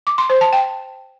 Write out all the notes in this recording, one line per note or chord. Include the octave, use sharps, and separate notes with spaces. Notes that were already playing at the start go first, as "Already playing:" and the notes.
D6
C6
C5
A5
G5